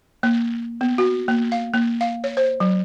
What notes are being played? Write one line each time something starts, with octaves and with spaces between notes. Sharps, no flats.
A#3
B3
F#4
A#3
F5
A#3
F5
C#5
C5
F#3